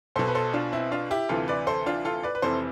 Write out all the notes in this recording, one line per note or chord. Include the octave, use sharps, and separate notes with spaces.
B1 B2 A4 C5
B4
A4 C5
D4 F4
C4 E4
D4 F4
E4 G4
D2 C3 E3 F4 A4
B4 D5
A4 C5
D4 F4
F4 A4
B4 D5
B4
F1 F2 C3 E3 A4 C5